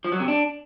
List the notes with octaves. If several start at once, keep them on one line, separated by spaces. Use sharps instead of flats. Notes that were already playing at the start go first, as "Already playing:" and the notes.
F3
F#3
C3
D4